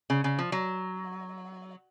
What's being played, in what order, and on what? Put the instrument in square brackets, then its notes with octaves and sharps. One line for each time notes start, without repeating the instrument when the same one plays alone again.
[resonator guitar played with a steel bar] C#3
C#3
F3
F#3